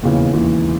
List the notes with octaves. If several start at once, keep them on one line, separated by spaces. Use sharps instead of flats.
E1 D#2 C#3 E3
E1 D#2 C#3 E3